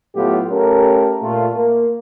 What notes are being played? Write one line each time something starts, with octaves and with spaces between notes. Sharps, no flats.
A2 F#3 A3 B3 F4 G4
A3 C#4 G4 A4 A#4
A#2 A3 F4
A#3